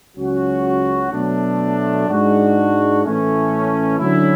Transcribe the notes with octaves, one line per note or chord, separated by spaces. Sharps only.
C#2 C#3 F#3 C#4 F#4
B2 F#3 A3 D4
G#2 G#3 D4 F#4
A2 E3 A3 C#4
D3 F#3 C#4 E4